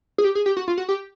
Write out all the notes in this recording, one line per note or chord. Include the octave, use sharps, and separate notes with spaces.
G#4
G4
G#4
G4
F#4
F4
F#4
G4